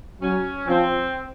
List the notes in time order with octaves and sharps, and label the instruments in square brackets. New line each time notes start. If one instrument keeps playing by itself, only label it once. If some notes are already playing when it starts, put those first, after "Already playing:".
[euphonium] F#3 [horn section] C#4
[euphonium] F3 [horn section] C4